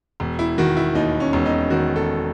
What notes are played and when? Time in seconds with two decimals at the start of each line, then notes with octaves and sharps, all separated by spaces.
0.20 E1
0.39 E4
0.58 D#3 F#4
0.77 E4
0.95 D#2 D#4
1.20 C#4
1.33 E1
1.46 D#4
1.70 D#3 F#4
1.96 A4